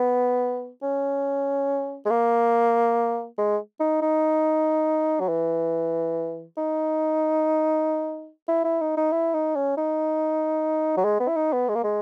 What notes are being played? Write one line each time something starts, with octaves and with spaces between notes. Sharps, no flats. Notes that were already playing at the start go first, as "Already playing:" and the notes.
Already playing: B3
C#4
G#3
A#3
G#3
D#4
D#4
F#3
E3
D#4
E4
E4
D#4
D#4
E4
D#4
C#4
D#4
F#3
G#3
B3
E4
D#4
B3
G#3
A#3
G#3